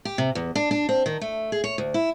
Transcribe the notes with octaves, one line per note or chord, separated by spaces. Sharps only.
G4
C3
E2
D4
D4
C4
D#3
A3
G#4
C#5
D2
E4